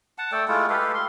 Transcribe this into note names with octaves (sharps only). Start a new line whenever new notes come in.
F#5 A5
A3 A4 D5 G5
G#3 A3 E4 F4
G4 A4 B4 F5
C6